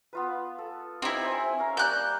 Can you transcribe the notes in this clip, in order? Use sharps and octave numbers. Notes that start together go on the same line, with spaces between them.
B3 F4 B4
A4
C4 D#4 E4 G4
C5 E5 G#5
C#4 A#4 F5
G3 A#3 D5 F#6 G6